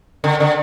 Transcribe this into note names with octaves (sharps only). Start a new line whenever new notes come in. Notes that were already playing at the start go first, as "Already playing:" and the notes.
D3
D3